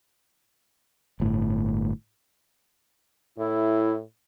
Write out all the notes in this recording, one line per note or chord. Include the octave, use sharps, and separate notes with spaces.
G1 A2
A2 E4